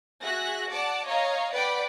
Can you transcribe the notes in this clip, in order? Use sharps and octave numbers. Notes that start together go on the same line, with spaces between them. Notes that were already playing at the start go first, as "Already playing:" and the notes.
F#4 G#4 E5 F#6 A#6
D5 F#5 A5 D6
C#5 D#5 F5 A#5
B4 D5 F#5 G5 B5 D6